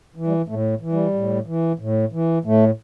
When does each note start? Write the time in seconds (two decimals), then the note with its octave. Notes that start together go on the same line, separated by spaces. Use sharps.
0.16 E3
0.27 G3
0.48 A2 A3
0.81 E3
0.93 G3
1.14 A2
1.46 E3
1.79 A2
2.12 E3
2.45 A2 A3